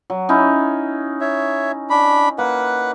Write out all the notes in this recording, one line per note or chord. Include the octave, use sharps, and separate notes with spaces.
F#3
C#4 D#4 E4
C#5 E5
D4 B5
A#3 B4 F#5